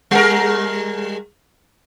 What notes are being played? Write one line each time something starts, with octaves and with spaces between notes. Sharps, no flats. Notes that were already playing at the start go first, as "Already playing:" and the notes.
G3 G#3 A#4